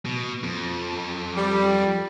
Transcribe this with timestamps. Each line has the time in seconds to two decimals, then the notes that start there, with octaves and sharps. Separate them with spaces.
0.05 B2
0.44 F2
1.37 G3